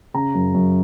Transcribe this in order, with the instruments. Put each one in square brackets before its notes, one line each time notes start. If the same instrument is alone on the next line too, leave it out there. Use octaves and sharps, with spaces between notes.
[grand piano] C#3 A#5
F#2
F#2